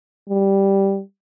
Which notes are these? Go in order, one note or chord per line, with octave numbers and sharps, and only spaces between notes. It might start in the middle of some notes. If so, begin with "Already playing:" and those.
G3